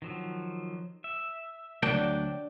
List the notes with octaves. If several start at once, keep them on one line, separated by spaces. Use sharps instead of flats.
D#3 F3 F#3
E5
D2 F#3 D4 G5